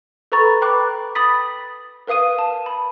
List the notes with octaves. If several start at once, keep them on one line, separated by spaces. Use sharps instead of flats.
A4 B4 A#5 B5 C#6 A6
B4 G5 B5 D6 F#6
B5 D#6 A6 B6
A#4 B4 F5 D#6 D#7
A5
B5